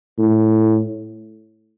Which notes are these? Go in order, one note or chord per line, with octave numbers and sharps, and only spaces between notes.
A2